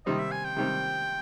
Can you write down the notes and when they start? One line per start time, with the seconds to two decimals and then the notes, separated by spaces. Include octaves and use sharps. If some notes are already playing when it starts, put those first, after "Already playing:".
0.06 C3 D#3 G3 C4 D#5
0.18 E5
0.32 G#5
0.44 G5
0.56 C3 D#3 G3 C4